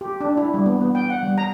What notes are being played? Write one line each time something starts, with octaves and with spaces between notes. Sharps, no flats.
G4
D4
E4
G3
B3
B3
G5
F#5
G3
A#5